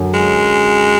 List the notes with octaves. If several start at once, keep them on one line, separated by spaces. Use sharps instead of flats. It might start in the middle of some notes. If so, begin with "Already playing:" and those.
Already playing: F#2 D3 F#3 C#4 F#4
G#3